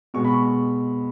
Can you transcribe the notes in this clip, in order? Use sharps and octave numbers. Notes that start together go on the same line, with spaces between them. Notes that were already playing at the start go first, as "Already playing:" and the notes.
B2 G#3 C#6
B5
C#6